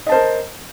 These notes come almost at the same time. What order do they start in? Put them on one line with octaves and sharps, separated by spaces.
D#5 A5 C5 A#4